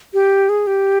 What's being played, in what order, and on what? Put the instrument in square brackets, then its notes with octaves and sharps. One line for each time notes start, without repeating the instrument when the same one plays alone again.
[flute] G4
G#4
G4